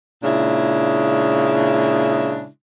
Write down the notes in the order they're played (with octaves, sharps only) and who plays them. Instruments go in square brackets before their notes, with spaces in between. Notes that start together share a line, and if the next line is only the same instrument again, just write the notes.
[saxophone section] A#2 C#3 G#3 D4 E4